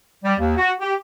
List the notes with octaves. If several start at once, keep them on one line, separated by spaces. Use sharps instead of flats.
G3
D#2
F#4
G4